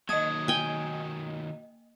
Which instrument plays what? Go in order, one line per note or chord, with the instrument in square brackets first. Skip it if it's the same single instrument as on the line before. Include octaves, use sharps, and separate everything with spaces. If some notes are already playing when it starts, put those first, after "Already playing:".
[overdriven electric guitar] D#3 F#3 [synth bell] A#3 D#5 [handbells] D#6 G#6
[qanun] G5 G#5